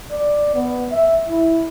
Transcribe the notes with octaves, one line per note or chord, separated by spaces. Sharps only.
D5
B3
E5
E4